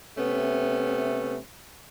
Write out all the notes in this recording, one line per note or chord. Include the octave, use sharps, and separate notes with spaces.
C3 A3 B3 C#4